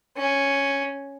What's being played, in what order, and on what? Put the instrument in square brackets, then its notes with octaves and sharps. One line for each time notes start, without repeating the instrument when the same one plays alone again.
[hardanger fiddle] C#4